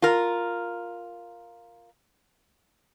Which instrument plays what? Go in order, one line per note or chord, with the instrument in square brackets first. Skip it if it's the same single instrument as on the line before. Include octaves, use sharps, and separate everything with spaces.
[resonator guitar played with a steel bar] F4 A#4